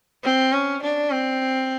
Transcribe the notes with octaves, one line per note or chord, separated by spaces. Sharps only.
C4
C#4
D4
C4